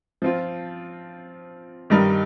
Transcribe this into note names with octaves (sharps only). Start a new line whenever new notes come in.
F3 C4 F4
G2 D#3 G3 D#4 A#4